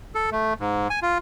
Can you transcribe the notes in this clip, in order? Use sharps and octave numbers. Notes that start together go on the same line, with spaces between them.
A4
A3
G#2
G#5
F4